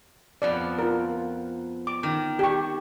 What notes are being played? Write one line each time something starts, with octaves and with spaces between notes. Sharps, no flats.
F2 F3 B3 D5
F4 A#4
D6
D#3
G4 C#6